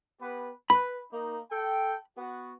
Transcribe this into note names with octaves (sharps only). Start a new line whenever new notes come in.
B3 G4 B4
B4 B5
A#3 D#4
A4 G5
B3 F#4